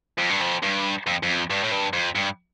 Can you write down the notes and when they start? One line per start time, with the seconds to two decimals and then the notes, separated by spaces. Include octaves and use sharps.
0.18 F2
0.30 G2
0.42 F2
0.63 G2
1.07 F2
1.23 F2
1.50 G2
1.63 A2
1.71 G2
1.93 F2
2.15 G2